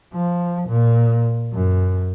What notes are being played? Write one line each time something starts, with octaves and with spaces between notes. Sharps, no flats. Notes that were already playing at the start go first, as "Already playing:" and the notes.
F3
A#2
F#2